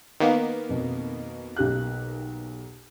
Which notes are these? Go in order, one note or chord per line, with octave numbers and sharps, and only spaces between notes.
D#3 A#3 B3
F2 B2
B1 G4 F#6